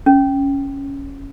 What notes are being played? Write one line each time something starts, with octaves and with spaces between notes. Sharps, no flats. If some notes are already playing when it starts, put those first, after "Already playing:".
C#4